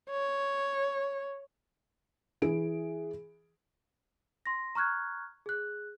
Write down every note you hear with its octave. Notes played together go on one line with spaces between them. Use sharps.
C#5
E3 G#4 D7
C6 A#6
A#5 C#6 F6 F#6 G#6
G#4 F#6